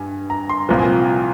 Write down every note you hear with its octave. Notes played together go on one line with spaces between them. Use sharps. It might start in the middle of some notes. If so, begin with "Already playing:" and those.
Already playing: G2 G#5
A#5
C6
C2 A#2 F3 A#5
G#5